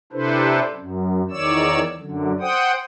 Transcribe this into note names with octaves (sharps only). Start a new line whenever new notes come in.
C3 D4 E4 A4 B4 C5
F#2
E2 D#3 C#5 D5 E6
F#2 D3
C5 F#5 G5 D#6